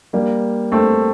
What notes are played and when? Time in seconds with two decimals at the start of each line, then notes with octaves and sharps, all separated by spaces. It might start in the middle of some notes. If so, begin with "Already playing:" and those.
0.13 G3 A#3
0.72 A3 C4